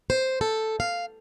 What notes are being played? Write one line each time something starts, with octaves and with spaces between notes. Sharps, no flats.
C5
A4
F5